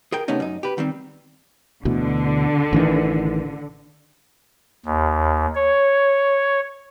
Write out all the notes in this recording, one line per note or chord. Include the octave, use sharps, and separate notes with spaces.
G#4 A#4 G5
C3 A3 B3 C#4 D#4
F#2 D#4
G4 B4
D#3 G3 C4
D2 B2 D3 E3
A1 D#3 E3
D#2
C#5